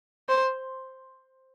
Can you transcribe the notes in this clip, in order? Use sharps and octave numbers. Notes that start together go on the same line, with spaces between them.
C5